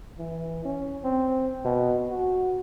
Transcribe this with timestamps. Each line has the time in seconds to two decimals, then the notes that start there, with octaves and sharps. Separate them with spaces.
0.18 E3
0.65 C#4
1.04 C4
1.65 B2
2.10 F#4